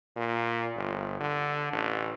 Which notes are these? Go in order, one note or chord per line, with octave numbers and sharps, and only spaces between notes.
A#2
G1
D3
A1